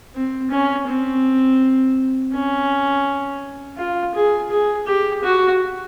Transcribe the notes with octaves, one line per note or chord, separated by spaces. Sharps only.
C4
C#4
C4
C#4
F4
G#4
G#4
G4
F#4